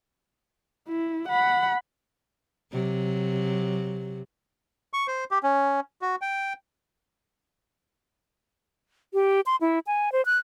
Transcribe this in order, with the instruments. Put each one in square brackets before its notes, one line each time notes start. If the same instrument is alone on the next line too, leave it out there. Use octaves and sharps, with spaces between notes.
[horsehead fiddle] E4
F#5 B5
[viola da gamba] C3 F#3
[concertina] C#6
C5
G4
C#4
F#4
G5
[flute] G4
C6
E4
G#5
C5
F#6